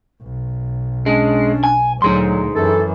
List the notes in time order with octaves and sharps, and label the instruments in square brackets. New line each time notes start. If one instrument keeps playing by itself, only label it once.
[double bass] B1
[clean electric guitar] G#3 [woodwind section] C#4 D4
[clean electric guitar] G#5
[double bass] D2 A#2 [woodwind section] F#3 [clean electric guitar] D#4 G#4 C6
[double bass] F#2 E3 [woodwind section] A4